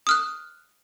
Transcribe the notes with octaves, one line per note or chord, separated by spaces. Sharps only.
D#6 F6 F#6